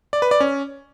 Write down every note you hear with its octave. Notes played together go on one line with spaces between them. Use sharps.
D5
B4
D5
C#4